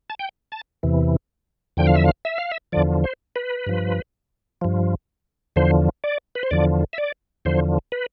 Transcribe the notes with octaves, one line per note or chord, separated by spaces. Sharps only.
A5
G5
A5
E2 C3 E3
E2 D3 F3 G5
F5
E5
F5
E5
F5
E5
E2 D3 F3 D5
C5
B4
G2 F3
G2 F3
E2 D3 F3 C5
D5
B4
C5
E2 D3 F3 D5
E5
D5
E2 D3 F3 C5
B4